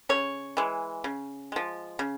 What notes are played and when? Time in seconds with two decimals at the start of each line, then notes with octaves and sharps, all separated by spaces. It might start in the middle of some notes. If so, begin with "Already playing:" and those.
0.09 C#3 C#5
0.57 E3 G#3
1.04 C#3
1.52 F3 G#3
1.99 C#3